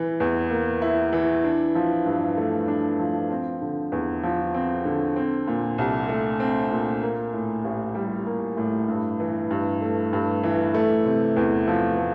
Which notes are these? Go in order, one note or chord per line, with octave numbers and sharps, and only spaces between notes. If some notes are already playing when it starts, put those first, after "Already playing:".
Already playing: E3 E4
E2
A#3
E4
E3
D4
F3
G2
A3
D4
F3
C4
D3
E2
F3
C4
D3
C4
A#2
C2
A3
C4
A#2
A#3
A2
A1
G3
A#3
A2
G2
E3
G2
A3
G2
E3
A3
C3
E2
F3
A3